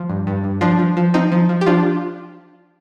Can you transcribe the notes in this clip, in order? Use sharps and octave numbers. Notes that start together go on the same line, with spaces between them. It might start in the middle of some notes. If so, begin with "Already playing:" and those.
Already playing: F3
G2
G2
G2
F3 D4 F4
F3
F3
F3 C4 D#4
F3
F3
G4
F3 D4 F4